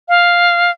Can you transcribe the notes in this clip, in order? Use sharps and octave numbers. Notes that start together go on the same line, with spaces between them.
F5